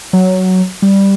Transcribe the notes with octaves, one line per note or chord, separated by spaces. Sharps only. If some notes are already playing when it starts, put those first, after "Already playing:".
F#3
G3